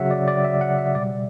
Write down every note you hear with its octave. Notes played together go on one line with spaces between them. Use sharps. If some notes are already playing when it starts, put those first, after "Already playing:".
Already playing: C#3 F#3 E5 F#5
D5
D5
E5
F#5
E5
B2 G3 D5